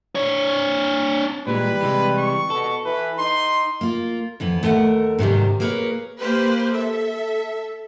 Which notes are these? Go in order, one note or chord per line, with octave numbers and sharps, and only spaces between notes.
D4 C#5
A#2 E3 G3 G#3 B4
C3 E3 G#3
C#6
B2 A4
E3 B4
D#4 C6
A#3 F4
F2 E3 B3
D#2 A3 A#4 F5 F#5
G#2 C3 D#3 G3
A#3 G#4 A#4 B4 C#5
A#3 G4 B4 C5
A4 E5